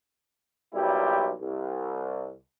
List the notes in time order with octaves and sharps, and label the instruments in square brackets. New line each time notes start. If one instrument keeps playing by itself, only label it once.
[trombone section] B1 A#2 F#3 G3 E4 G4
C2